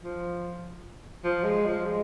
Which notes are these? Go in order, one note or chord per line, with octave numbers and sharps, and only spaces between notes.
F3
F3
G#3
F3
G#3